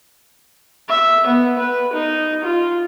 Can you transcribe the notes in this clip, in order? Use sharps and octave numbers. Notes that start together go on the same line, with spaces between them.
E5
B3
B4
D#4
F4